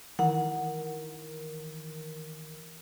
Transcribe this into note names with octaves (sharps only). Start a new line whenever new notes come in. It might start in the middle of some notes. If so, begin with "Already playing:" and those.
D#3 E3 A#4 F#5